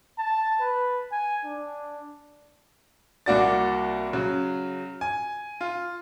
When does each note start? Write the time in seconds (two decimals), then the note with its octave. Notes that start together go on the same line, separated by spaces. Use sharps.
0.19 A5
0.61 B4
1.12 G#5
1.45 D4
3.26 C2 A#3 D4 F#4 D5 A6
4.13 C#3 F#3
5.01 G#5
5.61 F4